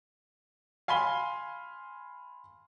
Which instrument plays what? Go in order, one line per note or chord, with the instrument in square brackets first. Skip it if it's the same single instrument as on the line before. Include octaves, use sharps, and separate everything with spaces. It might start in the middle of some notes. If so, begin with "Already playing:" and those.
[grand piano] F5 G#5 B5 C6 G7